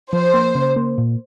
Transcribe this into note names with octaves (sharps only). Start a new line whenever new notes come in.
F3 C5
A#3
C#3
A#3
A#2